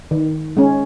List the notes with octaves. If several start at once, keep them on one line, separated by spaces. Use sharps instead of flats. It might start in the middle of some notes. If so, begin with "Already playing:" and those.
D#3
G#3 C#4